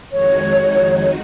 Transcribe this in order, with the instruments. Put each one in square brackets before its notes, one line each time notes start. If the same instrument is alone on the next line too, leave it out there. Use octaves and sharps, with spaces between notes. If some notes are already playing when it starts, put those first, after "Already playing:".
[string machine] F2 D#3 G#3 D#4 F#4 [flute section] C#5